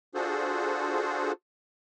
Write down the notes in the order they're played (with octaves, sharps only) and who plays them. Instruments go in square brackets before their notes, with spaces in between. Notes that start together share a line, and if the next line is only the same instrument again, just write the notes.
[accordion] D4 F4 F#4 G#4 A4 C5